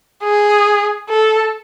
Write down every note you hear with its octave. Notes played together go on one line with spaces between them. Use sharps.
G#4
A4